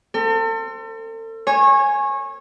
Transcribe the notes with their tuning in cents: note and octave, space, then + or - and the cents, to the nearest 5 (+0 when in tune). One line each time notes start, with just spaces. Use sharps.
C4 +0 A4 +40
C#5 -25 G#5 +0